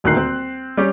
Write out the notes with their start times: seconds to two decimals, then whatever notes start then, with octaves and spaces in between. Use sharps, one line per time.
0.04 D#1 D2 D#3 F#6 C7
0.17 C4
0.77 G3 C#4 G4